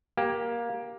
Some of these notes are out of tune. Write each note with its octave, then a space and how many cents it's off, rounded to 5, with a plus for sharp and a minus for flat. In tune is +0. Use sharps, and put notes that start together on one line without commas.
A#3 +15 G4 +0